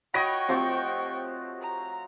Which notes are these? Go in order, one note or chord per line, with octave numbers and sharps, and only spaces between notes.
F#4 C#5 D#5 G5 B5 C#6 A#6 D7
F3 A3 C4 F#4 G4 C5
A#5